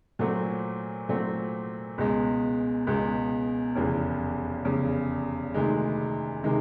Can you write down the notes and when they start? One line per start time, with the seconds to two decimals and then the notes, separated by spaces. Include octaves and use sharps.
0.19 A#2 F#3 A3 C4
1.09 A#2 F#3 A3 C4
1.98 C#2 B2 G#3
2.87 C#2 B2 G#3
3.76 F1 E2 C#3
4.65 F1 E2 C#3
5.54 D2 C3 D#3 G#3
6.44 C3 D#3 G#3